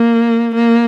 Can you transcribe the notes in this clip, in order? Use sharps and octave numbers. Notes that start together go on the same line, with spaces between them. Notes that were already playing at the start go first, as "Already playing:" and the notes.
Already playing: A#3
A#3